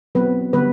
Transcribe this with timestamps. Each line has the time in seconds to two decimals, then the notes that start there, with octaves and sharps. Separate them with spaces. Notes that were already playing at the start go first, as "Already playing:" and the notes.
0.15 F#3 B3 C4 B4
0.53 D3 G3 B3 C4 B4